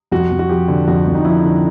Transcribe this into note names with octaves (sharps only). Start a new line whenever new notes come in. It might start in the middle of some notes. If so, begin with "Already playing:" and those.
F2 F#4
F2
F#4
F3 G4
D3
F2 F#4
F2
D#4
F3 E4
D3